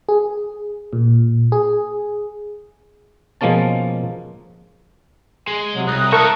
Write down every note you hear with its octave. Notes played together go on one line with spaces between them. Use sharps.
G#4
A#2
G#4
B2 F3 G#3 A#3 C#4 A5
G#3
C3 F#3
C2 A#5 D#6 F#6
A4 A#4 C#5 E5 C#6